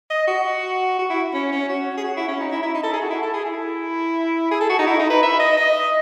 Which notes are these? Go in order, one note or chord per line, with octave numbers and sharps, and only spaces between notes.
D#5
F#4
F#4
E4
C#4
C#4
F#4
G#4
F#4
E4
C#4
D#4
E4
E4
D#4
A4
G#4
F#4
E4
A4
G#4
E4
G#4
A4
F#4
D#4
E4
D#4
B4
E5
D#5
D#5